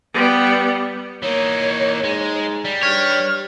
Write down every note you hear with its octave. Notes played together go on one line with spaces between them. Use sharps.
G3 B3
E3 A#3 D#4 C#5
G#2 G#3
G3
G2 C#5 F6